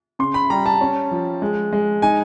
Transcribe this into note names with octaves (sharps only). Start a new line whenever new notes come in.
C#3 C6
B5
G3 A#5
A5
C#4
F3
G#3
G#3
D#4 G#5